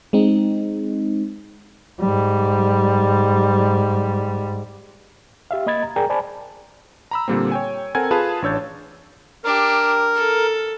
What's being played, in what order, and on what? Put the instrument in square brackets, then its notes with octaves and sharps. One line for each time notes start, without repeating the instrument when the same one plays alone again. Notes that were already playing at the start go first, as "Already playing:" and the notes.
[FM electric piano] G#3 C4 D#4
[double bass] G#2 G3
[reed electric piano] G4 E5 F5
A#3 D#5 B5 G#6 A6
A#5
G#4 A#4 D5 G5 G#5 A#5
C5 D5 G#5 A5 B5
[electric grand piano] A#5 B5 E6
A#2 D3 G3 A#3 C4
C#5 G5 G#5
C4 A4 A#4 F#5 G#5 G#6
F4 G#4 B4 F5 A5
A1 D4 C#5 E6 G6 A6
[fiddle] D4 G4 [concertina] A#4
[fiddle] A4